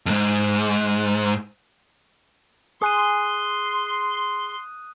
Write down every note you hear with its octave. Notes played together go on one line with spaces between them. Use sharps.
F2 G#2
G#4 C6 D#6 F#6 D#7